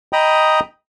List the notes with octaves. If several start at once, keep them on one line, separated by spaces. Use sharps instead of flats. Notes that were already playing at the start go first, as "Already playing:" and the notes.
D#5 G5 A#5 B5 D#6